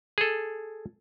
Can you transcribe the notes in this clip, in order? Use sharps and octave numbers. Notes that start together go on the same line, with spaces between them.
G#4 A4